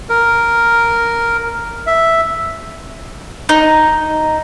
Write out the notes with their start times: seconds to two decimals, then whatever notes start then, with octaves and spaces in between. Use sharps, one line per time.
0.10 A#4
1.87 E5
3.49 D#4